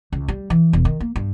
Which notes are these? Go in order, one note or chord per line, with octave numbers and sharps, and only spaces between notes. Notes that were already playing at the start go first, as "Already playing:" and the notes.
C#2
G3
E3
E1
D#3
A#3
G2